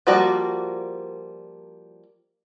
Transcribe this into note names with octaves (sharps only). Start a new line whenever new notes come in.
F3 G3 A#3 F#4 D5